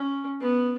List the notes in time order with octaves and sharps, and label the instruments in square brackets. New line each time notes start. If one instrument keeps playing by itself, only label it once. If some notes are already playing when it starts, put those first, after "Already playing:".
Already playing: [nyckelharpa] C#4
B3